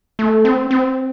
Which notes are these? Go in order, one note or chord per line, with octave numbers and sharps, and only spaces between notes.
A3
C4
C4